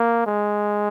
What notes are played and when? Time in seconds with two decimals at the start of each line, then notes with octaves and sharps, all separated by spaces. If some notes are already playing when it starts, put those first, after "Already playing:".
Already playing: A#3
0.27 G#3